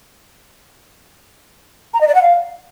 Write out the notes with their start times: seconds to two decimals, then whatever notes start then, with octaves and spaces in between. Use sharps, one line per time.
1.94 A#5
2.01 D#5
2.08 D5
2.15 F#5
2.22 F5